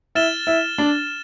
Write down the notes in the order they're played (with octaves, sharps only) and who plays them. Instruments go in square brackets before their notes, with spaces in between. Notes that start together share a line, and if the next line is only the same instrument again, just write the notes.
[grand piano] E4 [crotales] F6 A6 E7 G7
[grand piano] E4
D4